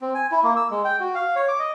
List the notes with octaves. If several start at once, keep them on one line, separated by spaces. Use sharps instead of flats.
C4
G#5
E4
A#3
E6
G#3
G5
F#4
F5
C#5
D6
D#5